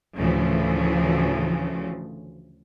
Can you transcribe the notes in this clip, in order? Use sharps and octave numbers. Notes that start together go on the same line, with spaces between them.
D2 A2 C#3 E3 F3